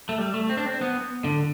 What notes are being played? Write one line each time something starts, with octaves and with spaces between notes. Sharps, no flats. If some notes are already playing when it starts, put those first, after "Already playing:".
A3
G3
A3
C4
D4
C4
B3
D3